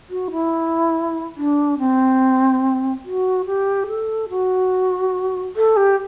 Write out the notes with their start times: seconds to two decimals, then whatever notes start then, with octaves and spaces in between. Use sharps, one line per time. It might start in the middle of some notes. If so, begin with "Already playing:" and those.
0.10 F#4
0.32 E4
1.37 D4
1.79 C4
3.05 F#4
3.46 G4
3.88 A4
4.30 F#4
5.56 A4
5.77 G4